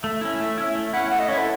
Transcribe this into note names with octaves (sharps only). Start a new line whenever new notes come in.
A3 E5
C#4 E4
A3
C#4 E4
A3
C#4 E4 F#5
A3 F#5
D#5
C#4 E4 C#5
A4